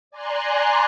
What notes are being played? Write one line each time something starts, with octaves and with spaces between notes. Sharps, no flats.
D5 G#5 A#5 C6 F#6